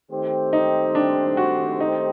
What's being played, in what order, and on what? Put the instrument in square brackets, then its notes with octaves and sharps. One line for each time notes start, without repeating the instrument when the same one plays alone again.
[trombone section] D#3 A3 C4 G4 C5
[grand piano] D#4
D4
F#4
D#4